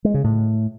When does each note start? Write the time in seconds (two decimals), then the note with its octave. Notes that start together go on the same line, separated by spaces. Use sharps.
0.05 G#3
0.14 C#3
0.24 A2